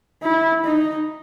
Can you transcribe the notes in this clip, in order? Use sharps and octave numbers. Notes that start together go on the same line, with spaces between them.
E4
D#4